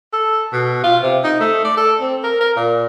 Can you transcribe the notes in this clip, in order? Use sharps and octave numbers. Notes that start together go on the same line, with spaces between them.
A4
B2
F4
C3
D#4
A3
D5
A4
C4
A#4
A#4
A#2